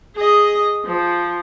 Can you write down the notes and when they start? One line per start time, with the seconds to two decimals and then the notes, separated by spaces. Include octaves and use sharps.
0.16 G#4 D#5
0.85 F3